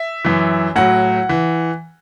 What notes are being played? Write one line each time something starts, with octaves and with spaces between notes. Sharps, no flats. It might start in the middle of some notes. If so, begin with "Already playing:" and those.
Already playing: E5
F#2 E3
A2 F#3 F#5
E3